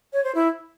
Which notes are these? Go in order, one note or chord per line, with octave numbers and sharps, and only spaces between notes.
C#5
C5
E4